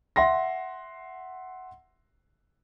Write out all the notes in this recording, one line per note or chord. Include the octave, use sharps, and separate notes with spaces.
E5 F#5 C6 A#6